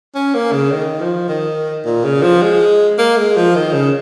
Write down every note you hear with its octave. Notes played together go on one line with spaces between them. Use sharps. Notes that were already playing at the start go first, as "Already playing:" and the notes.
C#4
A#3
C#3
D#3
F3
D#3
A#2
C#3
F3
G#3
A#3
G#3
F3
D#3
C#3